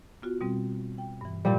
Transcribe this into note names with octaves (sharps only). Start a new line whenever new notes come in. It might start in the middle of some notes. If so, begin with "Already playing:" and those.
B3 F4 F#4
B2 G3 C4
G5
G2 E3
A#2 G3